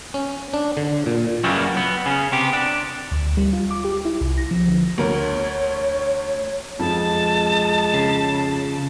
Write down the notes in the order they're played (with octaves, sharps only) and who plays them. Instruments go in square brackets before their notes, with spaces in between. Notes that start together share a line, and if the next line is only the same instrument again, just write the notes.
[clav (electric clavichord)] C#4
D4
D3
A#2
[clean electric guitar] F#2 C#3 F#3 G3 A#3 B3
B3
C#3 C#4
C3 B3 G4
D4
[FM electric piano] D2
G3
F4
D6
G4
E4
C2
A#6
F3
D3
[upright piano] D2 A#4 [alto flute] C#5
[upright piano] F2 F3 [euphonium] G#3 [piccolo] A5
[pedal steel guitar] C#3